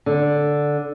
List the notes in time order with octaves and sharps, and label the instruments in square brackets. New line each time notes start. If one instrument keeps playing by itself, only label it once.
[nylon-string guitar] D3